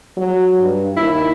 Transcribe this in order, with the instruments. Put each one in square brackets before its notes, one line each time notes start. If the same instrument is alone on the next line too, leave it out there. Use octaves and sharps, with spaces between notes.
[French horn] F#3
G2
[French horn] D#2 [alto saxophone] E4